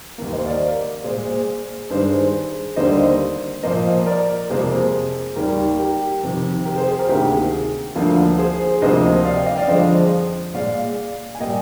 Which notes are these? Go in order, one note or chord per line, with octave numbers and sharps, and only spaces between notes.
D#2 D#3 A#3
C5 D#5
D5 F5
A#4 D5
A#2 G#3 G#4 C5
G2 D#3 G#3 G#4 C5
D#2 D3 G3 A#3 C5 D#5
A#2 F3 A#3 C5 D#5
A#4 D5
F2 C3 F3 A#3 G#4 C5
D#2 D#3 G3 A#3 G4 A#4
G4 A#4
F2 C3 D#3
G4 A#4
G#4 C5
G#4
G4 A#4
D2 C3 D#3 A#3 G4 A#4
G#4
D2 D3 F3 A#3
G#4 C5
D2 C3 F3 A#3 C5 D#5
D5 F5
D#5 G5
D#5 G5
D5 F5
F2 D3 F3 G#3 C5 D#5
A#2 G#3 D5 F5
G#5
A#2 G3 A#3 D#5 G5